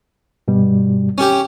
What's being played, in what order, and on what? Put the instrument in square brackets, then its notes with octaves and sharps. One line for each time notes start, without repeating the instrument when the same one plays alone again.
[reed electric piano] G2 B2 G3
[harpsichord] C#4 G4